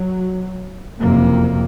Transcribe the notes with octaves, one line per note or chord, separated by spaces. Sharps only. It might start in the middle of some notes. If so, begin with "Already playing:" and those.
Already playing: F#3
F#1 F2 C3 A#3